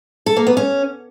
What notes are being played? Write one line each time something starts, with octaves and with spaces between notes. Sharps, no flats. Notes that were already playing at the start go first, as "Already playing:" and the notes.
A4
A#3
B3
C#4